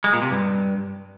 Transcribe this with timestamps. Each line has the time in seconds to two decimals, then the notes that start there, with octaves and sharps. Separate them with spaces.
0.04 G#3
0.13 A#2
0.22 C3
0.31 G2